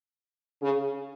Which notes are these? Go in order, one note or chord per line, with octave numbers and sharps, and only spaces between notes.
C#3